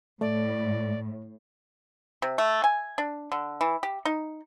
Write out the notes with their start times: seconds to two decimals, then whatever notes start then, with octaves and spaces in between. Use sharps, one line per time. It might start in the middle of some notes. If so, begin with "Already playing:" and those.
0.21 A2 A3 D5
2.22 C3
2.38 A3
2.64 G#5
2.98 D4
3.32 D3
3.61 E3
3.83 G4
4.05 D#4